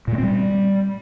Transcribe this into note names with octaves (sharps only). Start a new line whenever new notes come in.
A#2
A3
C4
G3